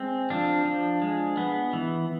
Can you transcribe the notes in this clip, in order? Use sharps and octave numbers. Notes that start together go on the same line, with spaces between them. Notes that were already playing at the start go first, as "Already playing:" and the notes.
Already playing: G#3 C4
F3 D4
F3
G#3
B3
E3